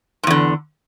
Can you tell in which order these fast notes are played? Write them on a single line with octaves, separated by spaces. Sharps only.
G#2 E2 D3